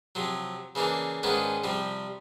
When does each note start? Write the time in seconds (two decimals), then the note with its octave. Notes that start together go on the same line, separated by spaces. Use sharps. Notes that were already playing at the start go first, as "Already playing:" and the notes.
0.15 C3 F3 F#3
0.75 C#3 E3 A#3 D4
1.23 G#2 D#3 G#3 B3 C#4 D4
1.64 C3 F3 G3